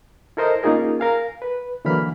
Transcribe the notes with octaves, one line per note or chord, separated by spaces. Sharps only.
E4 A4 A#4 C5 D#5
A#3 C#4 D#4 F4 G#4 A#4
A#4 F5 G#5
B4
D3 E3 F#3 A#3 B5 F6